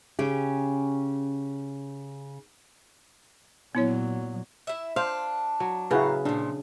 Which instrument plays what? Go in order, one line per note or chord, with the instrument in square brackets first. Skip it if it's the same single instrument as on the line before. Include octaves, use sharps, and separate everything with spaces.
[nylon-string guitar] C#3 C#4 G4
[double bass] A#2 F#3 [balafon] B3 E4 C#5
[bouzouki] E4 E5
[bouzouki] D4 [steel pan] C5 [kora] F5
[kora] F#3
[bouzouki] A2 F5 A#5 [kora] C#3 [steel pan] E4 F#4 B4
[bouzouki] A#2 F3 [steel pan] D4